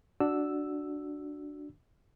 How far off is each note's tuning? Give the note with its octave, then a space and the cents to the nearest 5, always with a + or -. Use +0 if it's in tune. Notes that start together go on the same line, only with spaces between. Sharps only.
D4 +0 F#4 +0 E6 +0